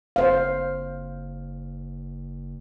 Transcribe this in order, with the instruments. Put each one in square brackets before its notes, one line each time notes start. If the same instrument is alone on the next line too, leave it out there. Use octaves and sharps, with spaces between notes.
[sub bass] F#1 [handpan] C5 F5